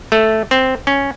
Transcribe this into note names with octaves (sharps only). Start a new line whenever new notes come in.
A3
C4
C#4